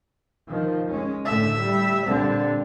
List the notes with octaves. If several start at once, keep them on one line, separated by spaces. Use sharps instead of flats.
D#3 F3
G#3 C#4
A2 D3 A3 E5
G3
A#2 D3 G3 C4